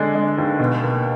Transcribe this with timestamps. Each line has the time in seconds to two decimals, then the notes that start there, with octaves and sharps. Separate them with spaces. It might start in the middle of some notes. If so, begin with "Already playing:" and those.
Already playing: D3 G#3 D4
0.15 G#3
0.38 D#2
0.59 B2
0.82 A#3